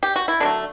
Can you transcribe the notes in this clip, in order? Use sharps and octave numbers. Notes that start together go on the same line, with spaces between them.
G4
F#4
E4
D3 F#3 A3 D4